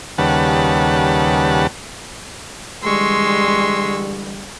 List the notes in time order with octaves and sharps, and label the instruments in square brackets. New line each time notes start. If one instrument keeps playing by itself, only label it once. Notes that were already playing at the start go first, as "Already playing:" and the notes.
[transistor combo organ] D#2 C#3 G3 B4 F#5 A5
[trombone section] D3 E3 G3 [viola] G#3 [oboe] C6 [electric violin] C#6 E6